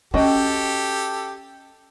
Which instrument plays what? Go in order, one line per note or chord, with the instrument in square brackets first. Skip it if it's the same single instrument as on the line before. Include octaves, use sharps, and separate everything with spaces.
[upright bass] C#4 [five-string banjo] F#4 D#5 G5 [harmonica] G4 A4